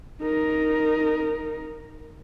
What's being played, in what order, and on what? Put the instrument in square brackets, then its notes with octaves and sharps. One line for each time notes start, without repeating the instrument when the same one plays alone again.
[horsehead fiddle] D#4 A#4